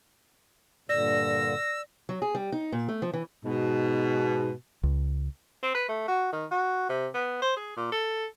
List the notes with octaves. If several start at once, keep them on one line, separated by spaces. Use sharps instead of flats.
G2 A#2 D3 D5 E6 A#6
F#3
G#4
G3
D#4
A#2
A3
F3
E3
G#2 B2
C#2
C4
B4
A3
F#4
D#3
F#4
C3
B3
C5
G#4
A#2
A4